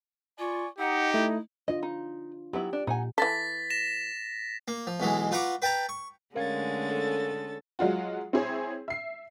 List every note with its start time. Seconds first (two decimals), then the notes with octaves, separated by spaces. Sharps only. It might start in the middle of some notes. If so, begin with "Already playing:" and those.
0.39 F4 D5 G#5 C#6
0.79 D#4 G4 F#5
1.14 A3 E4
1.68 D4 F4 D#5
1.83 D#4
2.53 F#3 B3 E4 G4
2.73 D4
2.87 A#2 D#4 F#5 G#5
3.18 E3 A4 A6 B6
3.70 A#6 E7
4.68 A#3
4.87 F3
5.00 B1 B2 E3 G#3
5.32 F4 B4 F#5 A#5 C#6 D6
5.62 B4 G5 A5 A#5
5.89 C#6
6.35 D3 G#3 A3 C#4 A#4 F5 G#6 A6
6.87 A4
7.79 F#3 G#3 F4 F#4
8.33 C4 E4 G#4 C#5
8.88 E5 C7